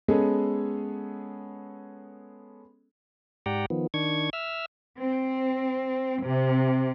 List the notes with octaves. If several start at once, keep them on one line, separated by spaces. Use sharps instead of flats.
G#3 B3 C#4 G#4 A4
G#2 G4 D5 F#5 G5 A#5
D#3 F3 B3
D#3 D4 C#6 G#6
E5 E6 F6
C4
C3